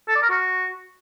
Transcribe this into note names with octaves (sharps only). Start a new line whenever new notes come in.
A4
D5
A#4
F#4